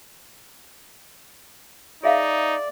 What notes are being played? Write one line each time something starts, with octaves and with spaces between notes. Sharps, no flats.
D#4 G#4 D5 E5 F5